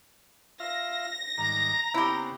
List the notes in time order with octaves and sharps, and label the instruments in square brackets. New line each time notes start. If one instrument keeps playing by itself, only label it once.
[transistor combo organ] F4 E5 F5 [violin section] A#6
[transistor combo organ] G#2 D#3 G3 [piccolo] A#5
[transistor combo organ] C#3 B3 C4 [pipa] E4 G4